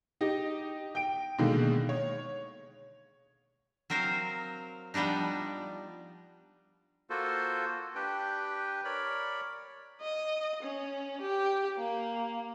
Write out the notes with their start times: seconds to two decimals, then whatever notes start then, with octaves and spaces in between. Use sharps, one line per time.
0.21 D#4 G4 D#5
0.95 G5 D7
1.38 B2 D3 D#3 G#3 A#3
1.89 C#5
3.90 F#3 C4 A#4 C5 F5
4.94 F3 G3 B3 D4 D#4
7.10 A#3 F4 F#4 A4 C5
7.95 D4 G4 B4 G5
8.85 A#4 C#5 D5 B5
10.01 D#5
10.63 C#4
11.21 G4
11.78 A#3